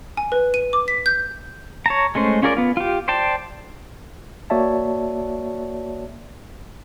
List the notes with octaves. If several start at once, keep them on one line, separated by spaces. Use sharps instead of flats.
G#5
B4
D#7
D6
B6
G6
C#5 A5 A#5
G#3 A3 C#4 C5
C#4 F4 G#4 A#4 D5
B3 F4
F4 G4
C5 D5 G5 A5
A#3 F#4 C#5 D5 E5 A5